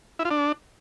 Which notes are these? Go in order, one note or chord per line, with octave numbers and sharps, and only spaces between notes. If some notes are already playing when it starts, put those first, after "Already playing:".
E4
F4
D4